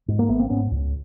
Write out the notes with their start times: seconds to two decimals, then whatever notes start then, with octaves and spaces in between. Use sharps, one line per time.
0.08 G#2
0.19 A#3
0.29 G#1 A3 B3
0.39 A#3 C4
0.50 G#2 B3 C#4
0.71 C#2